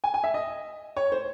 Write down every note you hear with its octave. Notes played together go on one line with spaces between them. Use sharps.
G#5
G#5
E5
D#5
C#5
C5